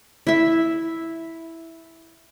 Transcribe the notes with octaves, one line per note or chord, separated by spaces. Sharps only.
E4 E5